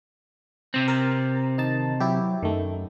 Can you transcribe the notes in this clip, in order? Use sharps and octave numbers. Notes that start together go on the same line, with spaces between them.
C3 C4
A#4 A6
D#3 D#4 A5
F#3 E4 G4
F#2 D#3 A3